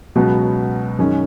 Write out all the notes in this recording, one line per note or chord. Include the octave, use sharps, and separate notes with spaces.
C#2 B2 F#3 B3 F#4
F#2 D#3 G#3 C#4